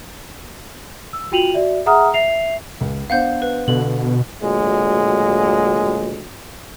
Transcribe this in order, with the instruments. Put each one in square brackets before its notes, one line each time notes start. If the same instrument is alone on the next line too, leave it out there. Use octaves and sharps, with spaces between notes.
[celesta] E6
F4 F#4 G5 D#7 F7 F#7
F#4 D5 E5
G#4 E5 F#5 A#5 D#6 F6
E5 C7 F7
[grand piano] C#2
[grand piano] B3 D4 C5 [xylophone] F5 F#5 G6
[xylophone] B4
[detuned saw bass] B2 [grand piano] D3 [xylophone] F#7
[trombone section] D2 A#2 F#3 G#3